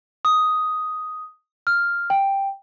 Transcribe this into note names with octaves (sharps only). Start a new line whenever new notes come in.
D#6
F6
G5